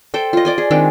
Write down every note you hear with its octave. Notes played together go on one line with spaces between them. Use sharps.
A4 C5 G5
F4 D#5
D5 D#5 G#5
G#4
D#3 G#3 C4 D4